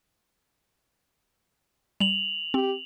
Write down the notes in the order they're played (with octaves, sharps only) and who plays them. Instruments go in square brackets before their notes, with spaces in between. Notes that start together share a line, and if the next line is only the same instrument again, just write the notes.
[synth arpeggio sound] G3 [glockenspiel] F7 F#7
[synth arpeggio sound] C4 [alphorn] G4